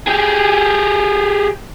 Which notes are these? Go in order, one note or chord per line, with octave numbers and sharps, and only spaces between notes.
G4 G#4